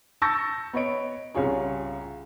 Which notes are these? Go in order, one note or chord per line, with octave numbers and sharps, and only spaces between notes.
A5 C#6 E6 G6 A6 A#6
B3 C#5 D#5 D7
C2 C#3 F4 G#4 C#5